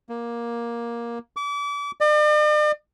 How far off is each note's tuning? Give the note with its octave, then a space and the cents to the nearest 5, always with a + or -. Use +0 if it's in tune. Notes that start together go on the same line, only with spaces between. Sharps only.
A#3 +10
D6 -35
D5 +45